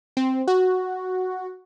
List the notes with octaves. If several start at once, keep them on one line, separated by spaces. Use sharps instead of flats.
C4
F#4